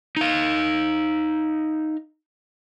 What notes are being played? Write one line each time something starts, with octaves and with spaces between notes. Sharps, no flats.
D#4 F5